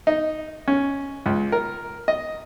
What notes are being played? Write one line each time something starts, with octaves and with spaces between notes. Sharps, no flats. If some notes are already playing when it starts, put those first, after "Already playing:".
D#4
C#4
C#2
A#4
D#5